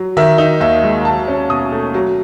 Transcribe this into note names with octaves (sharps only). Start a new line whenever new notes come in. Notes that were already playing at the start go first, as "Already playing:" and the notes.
Already playing: F#3
D#3 E5
D#4
D#2 E5
G#3
F#3 A5
C#4
B2 D#6
A3
F#3